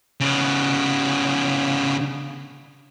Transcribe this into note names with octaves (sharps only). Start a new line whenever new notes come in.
C#3 B3